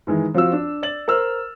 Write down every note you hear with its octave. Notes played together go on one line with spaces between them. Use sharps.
D#3 E3 G#3
F3 C4 F4 F#4 F5 E6
D4
D5 A6 F#7
A#4 C5 E6 F6